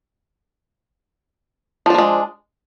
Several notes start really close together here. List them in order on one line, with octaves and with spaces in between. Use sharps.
F3 D4 A#3 G#3